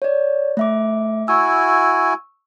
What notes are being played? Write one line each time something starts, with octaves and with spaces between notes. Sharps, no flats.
C#5 D5
A3 E5 D6
E4 F#4 G#5 C#6 E6